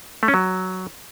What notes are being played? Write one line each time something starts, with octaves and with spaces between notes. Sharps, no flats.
A3
C#4
F#3